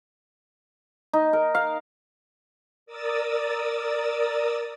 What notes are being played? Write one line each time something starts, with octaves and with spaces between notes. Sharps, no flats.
D#4
A#4
F5
A#4 D5 D#6 E6 A6